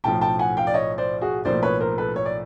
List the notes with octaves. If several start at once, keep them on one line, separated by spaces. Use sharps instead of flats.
B1 A2 F3 G5 A5
G5 A5
F#5 G#5
F5 G5
D5
C#5 D#5
C5 D5
F#4 G#4
B1 A2 F3 A#3 C5 D5
B4 C#5
A#4 C5
A4 B4
C#5
D5